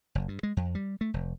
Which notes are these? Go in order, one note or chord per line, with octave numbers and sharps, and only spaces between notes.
F#1
G2
G#3
F2
G3
A3
F1